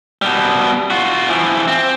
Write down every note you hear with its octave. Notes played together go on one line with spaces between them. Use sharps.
B2 G3
F4 F#4
E3 F3
C4